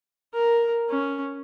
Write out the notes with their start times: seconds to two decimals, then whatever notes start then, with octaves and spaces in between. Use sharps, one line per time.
0.34 A#4
0.89 C#4